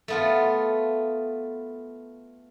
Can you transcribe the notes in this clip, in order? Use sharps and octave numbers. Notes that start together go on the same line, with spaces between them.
A3 B3 F4